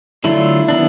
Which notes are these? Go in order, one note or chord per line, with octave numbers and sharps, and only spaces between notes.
D3 F#3 A3 D4 E4 F4
D#3 F#3 B3 D4